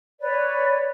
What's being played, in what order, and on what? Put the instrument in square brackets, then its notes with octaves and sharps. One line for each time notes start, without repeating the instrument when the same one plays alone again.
[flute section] B4 C#5 D5